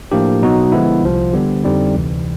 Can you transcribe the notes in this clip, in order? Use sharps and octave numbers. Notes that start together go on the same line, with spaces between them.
A2 F3 A#3 D4 G4
B2 F#3 B3 D#4 F#4
D3 F3 G#3 B3 E4
C2 C3 F3
D3 G3 B3 D4 G4
F2 D3 G3 C4 D#4
D2 C3 E3